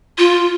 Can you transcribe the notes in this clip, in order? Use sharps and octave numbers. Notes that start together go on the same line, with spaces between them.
F4